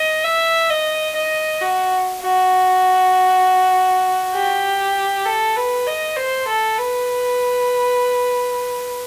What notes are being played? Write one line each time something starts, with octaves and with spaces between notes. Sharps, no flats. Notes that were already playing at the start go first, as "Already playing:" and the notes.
Already playing: D#5
E5
D#5
D#5
F#4
F#4
G4
A4
B4
D#5
C5
A4
B4